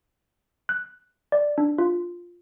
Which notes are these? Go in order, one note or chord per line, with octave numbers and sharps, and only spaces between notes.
F#6
D5
D4
F4